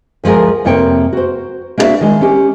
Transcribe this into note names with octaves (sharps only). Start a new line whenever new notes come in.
D2 F3 G#3 G#4 A#4
F2 C3 A#3 C#5 G5
F#4 C5
A#3 D4 E4 F#4 D5 E5
D#3 G#3
C#4 G4